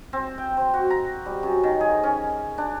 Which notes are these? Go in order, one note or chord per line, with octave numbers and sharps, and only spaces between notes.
C4
G5
C5
F#4
A#5
G3
F#2
D#3
G#4
C#4
D4